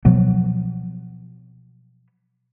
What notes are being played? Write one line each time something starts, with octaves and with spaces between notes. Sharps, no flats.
B2 F3 F#3 B3